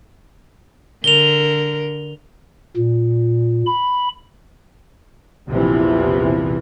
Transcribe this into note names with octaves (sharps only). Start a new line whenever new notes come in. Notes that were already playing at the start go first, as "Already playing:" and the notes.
D3 A#4 F7 G7
A#2
B5
A#1 E2 C3 E3 F3